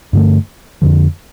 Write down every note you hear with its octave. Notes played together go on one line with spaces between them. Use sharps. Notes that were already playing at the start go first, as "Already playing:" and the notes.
G2 D3 A3
F2 D3 F3